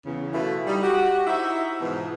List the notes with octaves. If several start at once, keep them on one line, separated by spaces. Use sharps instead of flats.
E2 C#3
B2 E3 A3 B3 E4 F4
G3 D#4
F#4 G4
D#4 E4 F#4 C5 E5
G#2 B2 E3 F3 G#3